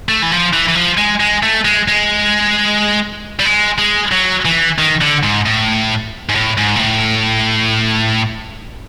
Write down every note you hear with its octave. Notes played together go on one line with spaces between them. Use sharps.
A3
E3
F3
E3
E3
F3
G#3
G#3
A3
G#3
G#3
G3
G#3
G#3
F#3
E3
D#3
D3
G#2
A2
G#2
A2
G#2
A#2
A2